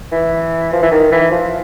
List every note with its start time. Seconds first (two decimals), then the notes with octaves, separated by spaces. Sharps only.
0.12 E3
0.73 F3
0.82 E3
0.91 D#3
1.12 E3
1.31 F3